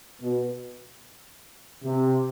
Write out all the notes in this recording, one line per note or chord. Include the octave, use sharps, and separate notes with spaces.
B2
C3